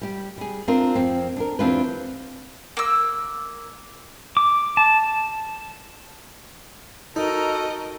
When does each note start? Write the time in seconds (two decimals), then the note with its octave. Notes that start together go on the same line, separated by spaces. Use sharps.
0.01 G3 G4
0.38 G3 G#4
0.68 C4 D4 F4 A#4
0.95 F2 C4
1.37 D4 A#4
1.59 E2 C4 D4 F4 G4 B4
2.77 A#3 E6
4.37 D6
4.77 A5
7.16 D#4 F#4 A4 A#4 D#5 A#5